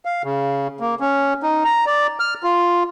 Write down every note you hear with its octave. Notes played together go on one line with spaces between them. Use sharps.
F5
C#3
A#3
C#4
D#4
A#5
D5
F6
F4